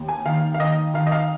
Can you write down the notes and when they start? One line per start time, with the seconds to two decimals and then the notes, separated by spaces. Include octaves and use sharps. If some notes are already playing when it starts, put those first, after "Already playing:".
Already playing: D#2
0.08 G#5
0.25 D#3 F5
0.54 F5
0.60 D#3 D#5
0.94 D#3 F5
1.06 D#5
1.12 F5